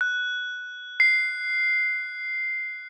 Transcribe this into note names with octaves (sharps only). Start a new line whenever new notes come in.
F#6
C7